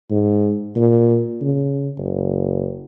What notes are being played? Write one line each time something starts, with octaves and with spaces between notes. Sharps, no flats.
G#2
A#2
C#3
F#1